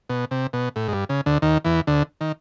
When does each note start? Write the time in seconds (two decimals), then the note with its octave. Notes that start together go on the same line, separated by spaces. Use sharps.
0.09 B2
0.31 C3
0.53 B2
0.76 A2
0.88 G#2
0.93 G2
1.09 C#3
1.26 D2 D3
1.42 D#2 D#3
1.65 E2 E3
1.87 D2 D3
2.21 D#3